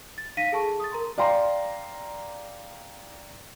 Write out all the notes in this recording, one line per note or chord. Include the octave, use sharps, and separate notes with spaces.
A6
D#4 F5 A#6 B6 D#7
G#4 A4 A5 C#6
D#6 A6
A#4 A#5 C6
D5 F5 G5 A#5 C6